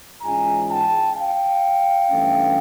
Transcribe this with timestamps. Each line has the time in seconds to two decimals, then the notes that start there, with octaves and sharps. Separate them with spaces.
0.22 G#2 E3 G#3 C#4 F4 G#5 A#5
0.69 G5 A5
1.16 F5 G5
2.10 G2 E3 A3 C#4